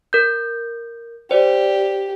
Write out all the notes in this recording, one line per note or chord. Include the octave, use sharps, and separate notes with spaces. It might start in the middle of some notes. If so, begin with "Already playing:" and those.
A#4 G6
G4 C5 D5